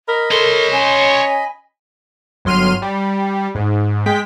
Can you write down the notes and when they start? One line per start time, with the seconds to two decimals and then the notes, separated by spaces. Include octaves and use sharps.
0.08 A#4 D#5 B5
0.31 A4 A#4 C#5 C6
0.72 C#4 G#5
2.45 G1 F#3 C6 F6 D#7
2.82 G3
3.55 G#2
4.06 G#3 G5 B6